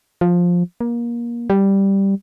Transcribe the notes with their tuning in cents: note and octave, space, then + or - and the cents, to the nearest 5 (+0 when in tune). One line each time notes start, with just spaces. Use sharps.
F3 +10
A#3 +25
G3 +0